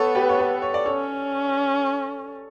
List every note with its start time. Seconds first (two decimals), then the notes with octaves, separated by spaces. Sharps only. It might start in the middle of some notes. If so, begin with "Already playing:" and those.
Already playing: B3 A4 C#5
0.15 G4 B4
0.29 C#5
0.39 G4 B4
0.62 C#5
0.74 D5
0.86 C#4 A4 C#5